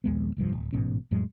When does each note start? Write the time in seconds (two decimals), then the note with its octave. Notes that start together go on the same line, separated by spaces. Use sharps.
0.04 A#1 D#2 G#3 B3
0.37 F1 C2 G2 F3
0.53 D1
0.73 A1 G#2 B2 C#4
1.11 F2 A2 F#3 G#3